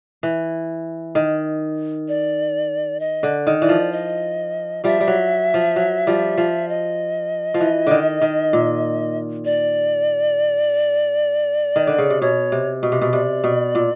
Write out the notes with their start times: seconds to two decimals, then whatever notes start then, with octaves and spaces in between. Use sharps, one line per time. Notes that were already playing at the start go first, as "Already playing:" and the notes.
0.23 E3
1.15 D#3
2.08 D5
3.00 D#5
3.23 D3
3.47 D#3
3.61 E3 D5
3.69 F3
3.92 D#5
4.84 F3 G3 E5
5.00 G3
5.08 F#3
5.54 F3
5.76 F#3
6.07 F3 G3
6.37 F3
6.69 D#5
7.54 F3
7.61 E3
7.87 D3 D#3
8.22 D#3
8.53 A#2
9.45 D5
11.76 D#3
11.87 D3
11.98 C#3
12.10 C3
12.21 B2 C#5
12.52 C3
12.83 B2
12.92 C3
13.01 B2
13.13 C3 D5
13.44 B2
13.75 A#2